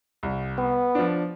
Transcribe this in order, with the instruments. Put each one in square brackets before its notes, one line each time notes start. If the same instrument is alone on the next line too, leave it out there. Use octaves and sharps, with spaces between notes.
[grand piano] C2
[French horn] B3
[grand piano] F3 D4